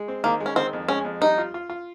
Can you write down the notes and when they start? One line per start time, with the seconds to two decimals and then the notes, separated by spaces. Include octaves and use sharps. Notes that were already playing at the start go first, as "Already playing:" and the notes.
Already playing: G#3
0.08 C4
0.24 D#3 A#3
0.40 G#3
0.46 C#4
0.56 D#3 C4
0.73 F2
0.89 G#3 C#4
1.05 F2
1.21 G3 D#4
1.38 F4
1.54 F4
1.70 F4